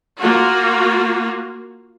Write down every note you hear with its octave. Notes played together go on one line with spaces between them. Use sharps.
A#3 F4 F#4